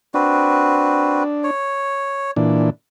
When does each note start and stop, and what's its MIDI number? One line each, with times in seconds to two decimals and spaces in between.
0.14 1.23 60
0.14 1.51 62
0.14 1.23 66
0.14 1.23 71
1.44 2.31 73
2.36 2.70 46
2.36 2.70 52
2.36 2.70 62